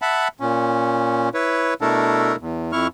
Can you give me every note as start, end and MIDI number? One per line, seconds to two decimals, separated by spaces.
0.02 0.28 76
0.02 0.28 78
0.02 0.28 81
0.02 0.28 83
0.40 1.29 46
0.40 1.29 61
1.34 1.74 64
1.34 1.74 71
1.34 1.74 73
1.81 2.36 47
1.81 2.36 57
1.81 2.36 62
1.81 2.36 64
1.81 2.36 69
1.81 2.36 70
2.40 2.72 40
2.72 2.87 41
2.72 2.87 64
2.72 2.87 85
2.72 2.87 89